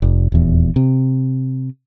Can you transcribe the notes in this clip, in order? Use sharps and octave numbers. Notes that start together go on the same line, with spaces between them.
F1
D#1 E2
C3